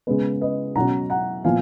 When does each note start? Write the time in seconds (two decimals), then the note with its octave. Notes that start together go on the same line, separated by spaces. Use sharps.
0.07 C#3 G#3 B3 B4
0.41 B4 D#5
0.76 B2 F#3 C#4 F#5 A#5
1.10 F#5 A#5
1.44 A#2 F3 B3 F5 G#5